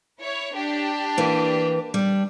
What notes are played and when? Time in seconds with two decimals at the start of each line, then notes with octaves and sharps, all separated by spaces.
0.22 E4 C#5
0.54 D4 G4
1.17 E3 A#3
1.94 G3 D4